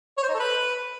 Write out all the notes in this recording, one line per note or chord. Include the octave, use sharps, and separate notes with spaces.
C#5
C5
D#4
A4
B4